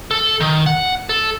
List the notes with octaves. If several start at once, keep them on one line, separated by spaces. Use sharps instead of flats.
A4
D#3
F#5
A4